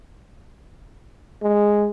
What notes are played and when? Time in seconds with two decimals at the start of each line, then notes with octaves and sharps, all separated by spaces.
1.43 G#3